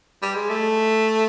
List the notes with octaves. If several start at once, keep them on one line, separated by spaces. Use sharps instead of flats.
G3
G#3
A3